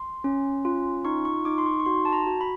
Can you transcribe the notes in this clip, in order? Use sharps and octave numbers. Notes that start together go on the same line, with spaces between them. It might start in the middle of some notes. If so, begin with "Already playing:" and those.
Already playing: C6
C#4
F4
D#4 C#6
C#6
D#4 D6
C6
C#6
C#6
F#4 C6
A5
A#5
F#4
B5